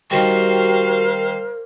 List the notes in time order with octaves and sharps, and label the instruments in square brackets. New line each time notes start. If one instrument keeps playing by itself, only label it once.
[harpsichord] D#3 G3 [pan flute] F#4 [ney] A#4 [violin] C5 F5